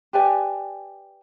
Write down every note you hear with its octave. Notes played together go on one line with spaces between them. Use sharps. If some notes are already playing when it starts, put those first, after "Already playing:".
G4 B4 D5 G#5